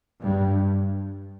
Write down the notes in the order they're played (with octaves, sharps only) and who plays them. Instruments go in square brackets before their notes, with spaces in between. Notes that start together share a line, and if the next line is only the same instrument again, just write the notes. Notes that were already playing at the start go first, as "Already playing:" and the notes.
[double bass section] G2